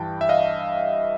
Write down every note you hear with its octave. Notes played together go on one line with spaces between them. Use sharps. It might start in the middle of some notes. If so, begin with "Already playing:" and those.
Already playing: G2 E3 G3 G5 A5
E5
D#5 F5